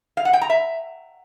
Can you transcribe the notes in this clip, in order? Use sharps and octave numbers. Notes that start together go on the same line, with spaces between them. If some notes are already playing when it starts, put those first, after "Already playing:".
F5
F#5
G5
A#5
E5